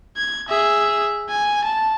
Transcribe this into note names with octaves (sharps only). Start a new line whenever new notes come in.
G#6
G#4 E5
G#5
A5